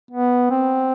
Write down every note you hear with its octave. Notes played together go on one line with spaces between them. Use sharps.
B3
C4